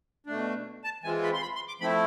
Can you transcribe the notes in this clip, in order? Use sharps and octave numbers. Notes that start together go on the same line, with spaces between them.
B2 A3 D4
A5
E3 G#3 C4 F4 G#5
B5
C6
B5
C6
D6
F3 A3 C4 E4 B5